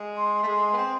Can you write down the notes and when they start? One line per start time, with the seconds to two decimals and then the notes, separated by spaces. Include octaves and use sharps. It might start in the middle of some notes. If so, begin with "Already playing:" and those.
Already playing: G#3
0.17 C6
0.43 A3
0.47 G#3
0.73 B3
0.77 C4